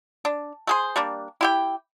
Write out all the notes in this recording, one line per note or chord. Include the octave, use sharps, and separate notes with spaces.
D4
A3 G#4 C5
G3 A#3 D4
E4 G4 G5